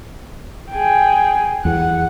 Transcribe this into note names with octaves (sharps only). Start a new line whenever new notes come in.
G#4 G5
E2 F#5